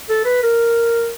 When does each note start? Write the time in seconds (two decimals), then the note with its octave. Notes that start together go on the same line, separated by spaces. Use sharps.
0.09 A4
0.25 B4
0.43 A#4